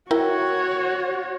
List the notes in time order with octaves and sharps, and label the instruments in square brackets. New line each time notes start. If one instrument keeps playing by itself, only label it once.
[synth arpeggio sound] E4 A#4 G5 [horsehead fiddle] F#4 C#5